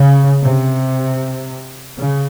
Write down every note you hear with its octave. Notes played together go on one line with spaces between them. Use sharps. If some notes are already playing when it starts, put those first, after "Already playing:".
Already playing: C#3
C3
C#3